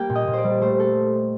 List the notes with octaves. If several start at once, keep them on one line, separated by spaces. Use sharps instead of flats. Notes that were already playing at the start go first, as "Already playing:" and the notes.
Already playing: G3 A#3 G5
A#2
D#5
A#2
C5 D5
G3
A3 C5
A4